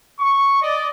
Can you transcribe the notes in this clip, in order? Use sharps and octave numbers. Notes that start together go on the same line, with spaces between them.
C#6
D5 D#5